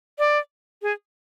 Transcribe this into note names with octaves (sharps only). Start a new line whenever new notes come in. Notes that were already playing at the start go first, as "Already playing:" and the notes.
D5
G#4